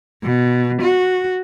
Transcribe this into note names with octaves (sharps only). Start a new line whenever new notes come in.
B2
F#4